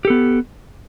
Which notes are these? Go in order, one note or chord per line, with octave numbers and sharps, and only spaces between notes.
B3 G4 A4